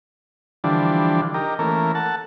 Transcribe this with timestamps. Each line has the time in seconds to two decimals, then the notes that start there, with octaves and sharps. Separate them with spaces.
0.64 D3 E3 F3 G3 D4
1.34 D#4 G4 A#4
1.59 E3 A3 A#3 C#4 A#4
1.95 A4 F#5 A5